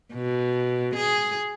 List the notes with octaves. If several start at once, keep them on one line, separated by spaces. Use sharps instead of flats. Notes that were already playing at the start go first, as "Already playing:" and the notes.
B2
G#4